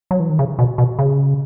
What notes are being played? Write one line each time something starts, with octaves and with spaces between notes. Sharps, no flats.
F#3
E3
D#3
C#3
B2
B2
C#3